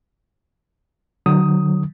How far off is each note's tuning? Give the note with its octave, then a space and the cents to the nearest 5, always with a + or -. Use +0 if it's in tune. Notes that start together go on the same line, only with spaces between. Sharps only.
D3 +35 F#3 +0 D#6 +10